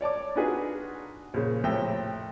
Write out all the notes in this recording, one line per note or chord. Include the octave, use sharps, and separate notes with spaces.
C#5 D5 A5 D6
D4 D#4 F4 F#4 G#4 B4
A#1 C#3
F2 A2 C3 G5 E6